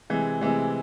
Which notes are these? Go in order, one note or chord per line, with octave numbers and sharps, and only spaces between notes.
C3 E3 G#3
C3 E3 G#3